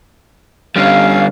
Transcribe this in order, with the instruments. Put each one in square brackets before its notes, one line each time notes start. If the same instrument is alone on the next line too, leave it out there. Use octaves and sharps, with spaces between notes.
[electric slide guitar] G2 D3 G3 [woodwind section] C#4 F5